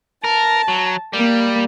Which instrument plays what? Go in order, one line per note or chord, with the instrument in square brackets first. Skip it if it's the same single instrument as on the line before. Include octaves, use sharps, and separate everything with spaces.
[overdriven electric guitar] A#4 [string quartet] A5
[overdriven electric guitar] F#3
[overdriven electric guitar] G3 [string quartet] A#3